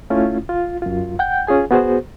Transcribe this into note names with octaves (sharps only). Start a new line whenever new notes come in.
A3 C#4 E4 F4
F4
F#2 F4
F#5 G5 G6
C#4 F4 G#4 G#5
B3 F#4 G#4 C5